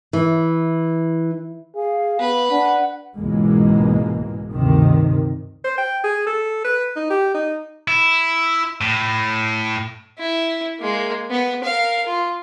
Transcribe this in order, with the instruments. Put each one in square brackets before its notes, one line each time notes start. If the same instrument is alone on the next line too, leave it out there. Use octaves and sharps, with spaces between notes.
[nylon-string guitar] E3
[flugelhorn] G#4 [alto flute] F5
[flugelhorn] B3 [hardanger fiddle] B4
[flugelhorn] D4 [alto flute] F#5
[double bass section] C#2 G#2 B2 E3 G#3 A#3
D2 G2 C3 D#3
[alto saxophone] C5
G5
G#4
A4
B4
D#4
G4
D#4
[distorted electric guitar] E4
A2
[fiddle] E4
G#3 A#3
B3
A#4 F5
F4